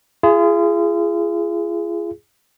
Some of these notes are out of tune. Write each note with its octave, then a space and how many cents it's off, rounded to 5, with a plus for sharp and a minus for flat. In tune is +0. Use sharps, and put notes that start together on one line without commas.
F4 -40 G#4 +0